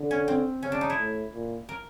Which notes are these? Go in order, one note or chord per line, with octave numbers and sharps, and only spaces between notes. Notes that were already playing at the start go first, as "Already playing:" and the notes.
Already playing: D3
C#4
C4
C#3 C#4
D4
D#4
E4
A2
A#2
A#4